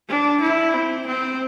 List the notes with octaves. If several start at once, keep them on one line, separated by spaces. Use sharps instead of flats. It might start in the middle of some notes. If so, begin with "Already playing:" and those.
D4
E4
C4
C4